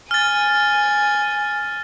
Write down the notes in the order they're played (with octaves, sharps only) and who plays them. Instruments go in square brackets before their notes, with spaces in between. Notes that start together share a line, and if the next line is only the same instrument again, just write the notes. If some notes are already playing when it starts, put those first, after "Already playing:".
[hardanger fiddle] G#5 [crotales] F6 A6